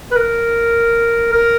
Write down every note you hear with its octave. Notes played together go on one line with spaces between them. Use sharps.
B4
A#4
A#4